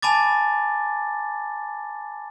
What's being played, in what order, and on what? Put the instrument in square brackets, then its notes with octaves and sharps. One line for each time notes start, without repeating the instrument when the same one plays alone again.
[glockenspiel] G#5 A5 B5 D6 A6